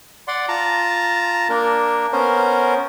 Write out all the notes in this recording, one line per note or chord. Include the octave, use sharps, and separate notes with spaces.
D5 F#5 C6
F4 A5 A#5
A#3 D4 A#4
B3 C#4 A#4 C5